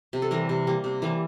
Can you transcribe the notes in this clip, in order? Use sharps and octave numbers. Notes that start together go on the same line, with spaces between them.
C3
A4
E3 G3 A#4
C3
G3 A#3
C3
E3 G3 A#3